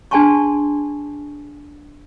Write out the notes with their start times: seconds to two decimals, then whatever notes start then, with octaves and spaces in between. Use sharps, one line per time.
0.11 D4 G#4 G#5 A5 C6 C#6